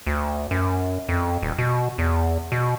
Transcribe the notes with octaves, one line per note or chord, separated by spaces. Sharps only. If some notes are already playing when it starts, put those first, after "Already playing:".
D2
F#2
F2
D#1
B2
E2
B2